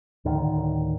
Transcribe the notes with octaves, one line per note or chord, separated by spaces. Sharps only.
D2 A2 D3 D#3